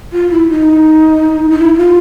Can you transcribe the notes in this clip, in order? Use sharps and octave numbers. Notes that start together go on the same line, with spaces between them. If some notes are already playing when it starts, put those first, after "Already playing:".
F4
E4
D#4
D#4
E4
F4